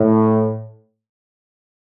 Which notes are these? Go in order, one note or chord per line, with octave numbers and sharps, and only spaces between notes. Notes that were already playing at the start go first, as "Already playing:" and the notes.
Already playing: A2